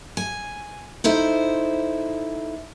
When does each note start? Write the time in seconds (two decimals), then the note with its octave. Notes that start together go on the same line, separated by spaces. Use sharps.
0.17 G#5
1.04 D#4 E4 A4 C5